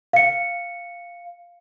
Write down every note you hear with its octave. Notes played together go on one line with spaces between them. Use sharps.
F5 C#7